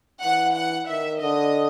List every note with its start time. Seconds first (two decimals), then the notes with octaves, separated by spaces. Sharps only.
0.24 E3 F#5
0.56 F#5
0.89 D#3 E5
1.21 D3 D#5